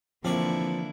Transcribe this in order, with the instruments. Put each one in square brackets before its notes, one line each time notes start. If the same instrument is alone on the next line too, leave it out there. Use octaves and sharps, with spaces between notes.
[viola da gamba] D3 E3 E4 [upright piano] F3 [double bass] A#3 [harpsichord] C4 D5 C#6